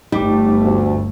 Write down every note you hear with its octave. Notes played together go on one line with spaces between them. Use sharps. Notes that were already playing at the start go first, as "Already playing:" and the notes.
G1 G3 A3 D#4 G4 D6
D2